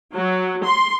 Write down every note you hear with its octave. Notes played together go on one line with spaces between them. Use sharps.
F#3
C6